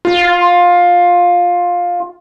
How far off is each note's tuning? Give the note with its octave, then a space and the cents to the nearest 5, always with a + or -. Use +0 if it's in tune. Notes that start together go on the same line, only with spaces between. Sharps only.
F4 +15